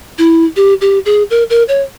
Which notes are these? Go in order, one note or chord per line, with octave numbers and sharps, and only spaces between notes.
E4
G4
G4
G#4
A#4
A#4
C#5